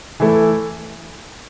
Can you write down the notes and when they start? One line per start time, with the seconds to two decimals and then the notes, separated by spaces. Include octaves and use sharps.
0.20 E3 A3 E4 A4